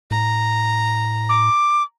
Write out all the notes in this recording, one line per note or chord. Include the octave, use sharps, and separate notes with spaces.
A2 A#5
D6